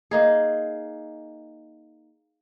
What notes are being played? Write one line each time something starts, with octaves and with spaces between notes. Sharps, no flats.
A#3 D#4 G#4